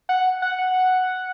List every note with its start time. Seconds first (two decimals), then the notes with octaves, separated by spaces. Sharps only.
0.09 F#5
0.42 F#5
0.58 F#5